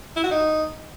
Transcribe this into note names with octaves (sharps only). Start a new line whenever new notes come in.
E4
F#4
D#4